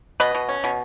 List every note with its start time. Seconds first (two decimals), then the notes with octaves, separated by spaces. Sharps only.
0.20 B2 B4 D#5
0.35 B2
0.49 C#4
0.64 B2